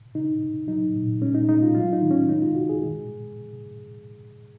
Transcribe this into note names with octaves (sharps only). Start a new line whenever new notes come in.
C#3 D#4
C#3
F#3 D#4
A#2
G#3 C#4
D#4
G#3 D#4
F4
F#3 F4
D#4
D#3
C#4
G#3 D#4
F4
B2 F#4
G#4
G#3
G#3